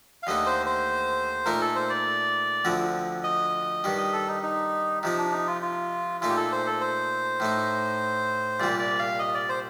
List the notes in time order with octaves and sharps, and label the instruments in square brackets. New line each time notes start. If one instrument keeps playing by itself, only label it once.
[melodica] F5
[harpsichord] D#2 D3 A3 D#4 [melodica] D#5
[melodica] C5
C5
[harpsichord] A#2 A3 D#4 [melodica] A#4
[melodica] A4
C5
D5
[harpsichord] D2 D3 F3 C4
[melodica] D#5
[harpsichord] G2 D#3 G3
[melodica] D#5
A4
D#4
D#4
[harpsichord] C3 F3 C4 [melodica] D#4
[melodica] D4
D#4
F4
F4
[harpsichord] A#2 A3 D#4 [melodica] F4
[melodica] G4
A4
C5
A4
C5
[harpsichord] A2 A3 D#4
[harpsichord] C2 A#2 G3 [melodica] D5
[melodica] D5
F5
D#5
D5
C5